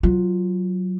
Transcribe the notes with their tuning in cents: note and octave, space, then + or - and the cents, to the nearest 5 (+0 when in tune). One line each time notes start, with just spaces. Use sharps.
F#3 +0 F4 +0